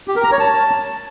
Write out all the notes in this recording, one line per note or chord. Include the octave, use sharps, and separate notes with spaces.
G4
A#4
A#5
C#5
A5